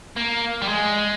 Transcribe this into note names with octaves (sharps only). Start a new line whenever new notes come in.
A#3
G3
G#3